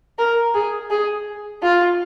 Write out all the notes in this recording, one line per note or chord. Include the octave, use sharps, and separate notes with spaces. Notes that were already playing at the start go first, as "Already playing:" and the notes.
A#4
G#4
G#4
F4